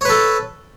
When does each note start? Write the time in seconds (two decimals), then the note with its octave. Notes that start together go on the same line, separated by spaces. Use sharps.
0.01 C#5
0.05 B4
0.09 A4